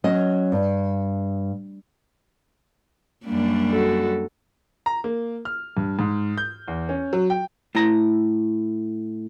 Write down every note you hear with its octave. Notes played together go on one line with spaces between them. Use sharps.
F#3 C#4 D#5
G2
F#2 G3 A#3 D4
F#4 A4
A#5
A#3
F6
G2
G#2
G6
E2
C#4
F#3
G5
A2 E4 A#5